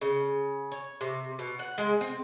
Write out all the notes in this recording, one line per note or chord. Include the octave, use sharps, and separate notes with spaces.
C#3
C#5
C3
B2
F#5
G#3
C4